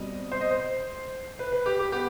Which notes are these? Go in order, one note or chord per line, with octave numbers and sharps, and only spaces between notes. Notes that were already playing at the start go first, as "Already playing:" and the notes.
Already playing: B2 G3 C4 D#5
C5
D#5
C5
B4
B4
G4
G4
B3 G4